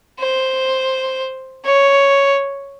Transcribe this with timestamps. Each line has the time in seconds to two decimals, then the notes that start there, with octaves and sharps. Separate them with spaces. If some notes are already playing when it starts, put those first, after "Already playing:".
0.20 C5
1.65 C#5